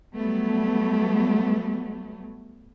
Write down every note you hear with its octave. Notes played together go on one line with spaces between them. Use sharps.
F#3 G3 A3 B3